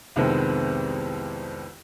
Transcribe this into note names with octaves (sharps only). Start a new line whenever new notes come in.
C2 F2 D#3 G#3 B3 C4